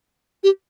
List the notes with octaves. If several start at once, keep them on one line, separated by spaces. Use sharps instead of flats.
G4